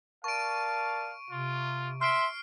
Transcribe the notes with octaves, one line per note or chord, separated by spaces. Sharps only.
A#4 D5 F5 A5 C#6 D7
C3 F4
E5 C6 F6 C7 D7